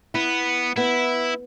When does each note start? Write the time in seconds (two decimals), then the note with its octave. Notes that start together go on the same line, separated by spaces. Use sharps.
0.14 B3 E4
0.76 B3 E4